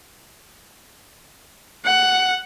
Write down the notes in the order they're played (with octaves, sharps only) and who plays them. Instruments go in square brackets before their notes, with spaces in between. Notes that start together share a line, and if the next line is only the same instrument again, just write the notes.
[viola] F#5